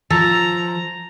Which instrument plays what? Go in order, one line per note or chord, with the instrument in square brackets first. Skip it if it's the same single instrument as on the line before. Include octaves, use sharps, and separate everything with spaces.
[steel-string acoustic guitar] F3 [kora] A4 [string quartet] A#5